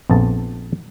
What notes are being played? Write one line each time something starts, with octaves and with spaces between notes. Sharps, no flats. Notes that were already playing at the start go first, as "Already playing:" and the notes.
A#1 F2 B3 A5